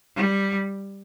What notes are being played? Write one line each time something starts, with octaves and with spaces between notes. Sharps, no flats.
G3